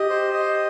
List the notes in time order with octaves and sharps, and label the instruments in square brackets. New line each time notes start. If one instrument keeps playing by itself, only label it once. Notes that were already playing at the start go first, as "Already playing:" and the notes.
Already playing: [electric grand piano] G4 [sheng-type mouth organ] D#5
[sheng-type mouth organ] C5
D#5